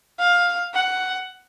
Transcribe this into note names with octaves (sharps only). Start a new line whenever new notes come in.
F5
F#5